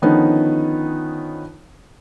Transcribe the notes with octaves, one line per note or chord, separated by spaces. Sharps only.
D3 D#3 F3 B3 C#4 D#4